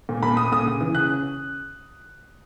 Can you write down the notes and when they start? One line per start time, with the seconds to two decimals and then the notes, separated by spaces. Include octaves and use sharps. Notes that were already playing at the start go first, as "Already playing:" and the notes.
0.09 A#2
0.23 A#2 B5
0.37 A3 D#6
0.52 A#2 D#6
0.66 C#3
0.81 E3
0.95 C#3 F#6
1.09 C#4